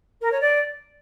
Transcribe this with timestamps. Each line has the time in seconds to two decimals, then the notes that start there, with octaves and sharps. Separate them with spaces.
0.21 A#4
0.31 C#5
0.40 D5